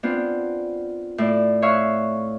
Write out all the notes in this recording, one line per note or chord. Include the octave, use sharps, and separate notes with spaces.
B3 C4 D4 F4
A2 D5
C#5 E5 F5 C#6 F#6